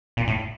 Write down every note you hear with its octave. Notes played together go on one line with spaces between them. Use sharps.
A#2
A2